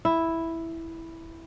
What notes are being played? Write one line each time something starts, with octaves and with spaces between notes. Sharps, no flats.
E4